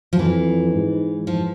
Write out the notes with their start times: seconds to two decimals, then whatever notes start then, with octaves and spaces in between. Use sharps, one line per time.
0.13 F3
0.19 F2 E3
0.73 G#2
1.27 F3